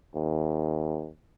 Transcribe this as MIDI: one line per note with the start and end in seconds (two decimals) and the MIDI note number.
0.15 1.09 39